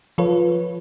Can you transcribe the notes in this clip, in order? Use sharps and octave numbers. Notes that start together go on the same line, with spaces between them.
F3 F4 A4 B4 C#5